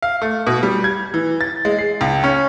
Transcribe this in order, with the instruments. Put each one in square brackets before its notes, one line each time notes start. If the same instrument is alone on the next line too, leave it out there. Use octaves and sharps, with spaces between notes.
[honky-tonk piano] F5
A3
B2
G3
G#6
E3
A6
G#3
C7
C#2
C#4